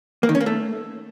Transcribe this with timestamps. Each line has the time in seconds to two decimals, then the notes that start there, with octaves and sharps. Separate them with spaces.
0.23 A#3
0.29 D#3
0.35 C#4
0.41 A#3
0.46 A3